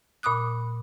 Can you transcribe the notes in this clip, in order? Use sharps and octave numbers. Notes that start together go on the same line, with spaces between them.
A#2 B5 D6 D#6 F#6